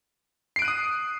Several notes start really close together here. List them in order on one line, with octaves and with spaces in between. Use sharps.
C7 D7 F#6 D#7 D#6